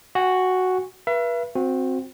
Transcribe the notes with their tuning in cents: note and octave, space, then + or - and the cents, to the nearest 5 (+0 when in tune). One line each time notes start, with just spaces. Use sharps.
F#4 +0 G#5 -35
B4 -35 E5 +40
C4 +0 F#4 -25